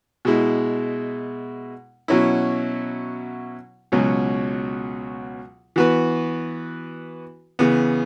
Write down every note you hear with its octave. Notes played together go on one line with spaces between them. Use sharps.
B2 G#3 E4
B2 F#3 C#4 E4
C#2 B2 F#3 C#4
E3 B3 F#4 B4
C#3 E3 B3